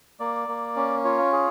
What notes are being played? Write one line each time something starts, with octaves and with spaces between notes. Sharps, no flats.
A#3 D5
A#3
C#4
F4 C#5
G#4